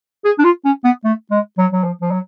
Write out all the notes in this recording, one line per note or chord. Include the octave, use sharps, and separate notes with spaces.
G#4
D4
F4
C#4
B3
A3
G#3
F#3
F#3
F3
F3
F#3